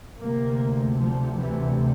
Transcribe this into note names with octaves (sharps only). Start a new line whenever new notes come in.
D2 C3 A#3
F3
E3